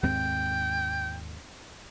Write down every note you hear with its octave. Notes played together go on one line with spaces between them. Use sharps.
D#2 G#2 C4 G5